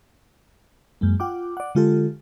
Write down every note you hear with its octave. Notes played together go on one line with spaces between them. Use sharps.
F#2 G#3 A#3
F4 F#5 G5 D6
D5 F#5
D3 G#3 F4 G4 A4